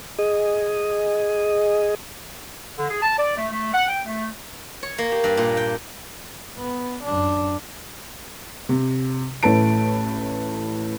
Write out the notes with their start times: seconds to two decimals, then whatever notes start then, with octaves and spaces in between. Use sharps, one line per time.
0.19 G#4 D#5
2.78 D3
2.90 G#4
3.02 A5
3.18 D5
3.37 A3
3.52 A3
3.74 F#5
3.88 G5
4.06 A3
4.83 C#5
4.98 A#3
5.12 G4
5.24 G2
5.37 A#2
5.57 G5
6.58 B3
7.03 F#2 D4
8.69 C3
9.43 A1 A2 A3 B4 A5 D7